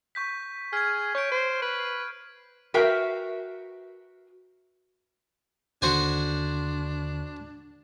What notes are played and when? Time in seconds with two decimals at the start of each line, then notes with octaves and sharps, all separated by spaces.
0.15 C#6 G6 B6
0.73 G#4 F6 G#6
1.15 C#5 C#6 G6 D7
1.32 C5
1.62 B4
2.74 F#4 A#4 B4 E5 F5 G5
5.82 D#2 D3 D4 F#4 C5 G#5